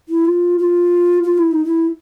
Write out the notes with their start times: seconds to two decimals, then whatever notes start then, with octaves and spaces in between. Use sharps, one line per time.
0.08 E4
0.25 F4
0.59 F4
1.24 F4
1.38 E4
1.51 D#4
1.65 E4